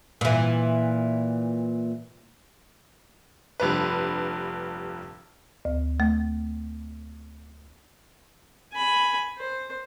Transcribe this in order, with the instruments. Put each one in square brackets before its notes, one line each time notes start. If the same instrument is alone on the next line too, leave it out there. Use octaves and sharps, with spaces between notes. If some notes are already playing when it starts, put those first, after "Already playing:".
[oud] A#2 E3
[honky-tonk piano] F1 G2 B4
[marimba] D2
A3
[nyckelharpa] G#5 B5
C5